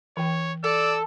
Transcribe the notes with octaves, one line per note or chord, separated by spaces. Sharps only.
E3 C#5 G5
A4 D5 E6